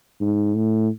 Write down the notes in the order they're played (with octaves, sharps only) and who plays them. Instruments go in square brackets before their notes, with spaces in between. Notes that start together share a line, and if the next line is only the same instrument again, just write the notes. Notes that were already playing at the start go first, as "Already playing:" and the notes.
[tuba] G#2
A2